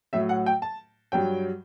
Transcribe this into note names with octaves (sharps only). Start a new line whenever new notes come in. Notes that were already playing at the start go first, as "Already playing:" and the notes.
A2 F#3 E5
F#5
G5
A5
G2 F#3 G5